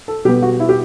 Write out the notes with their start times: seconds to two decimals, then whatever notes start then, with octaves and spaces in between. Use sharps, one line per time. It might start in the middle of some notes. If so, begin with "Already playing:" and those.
0.08 A4
0.25 B2 G3 B3 G4
0.42 F#4
0.60 E4
0.69 G4